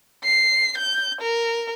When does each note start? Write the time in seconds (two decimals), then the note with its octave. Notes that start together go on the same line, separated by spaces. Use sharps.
0.24 C7
0.78 G6
1.21 A#4